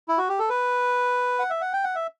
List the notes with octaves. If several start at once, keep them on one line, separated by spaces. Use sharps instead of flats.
E4
F#4
G4
A4
B4
F#5
E5
F#5
G5
F#5
E5